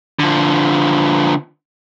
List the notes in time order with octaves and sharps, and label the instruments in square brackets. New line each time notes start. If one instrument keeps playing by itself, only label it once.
[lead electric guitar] D3 F3